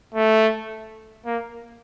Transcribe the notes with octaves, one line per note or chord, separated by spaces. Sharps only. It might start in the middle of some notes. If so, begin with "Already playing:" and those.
A3
A#3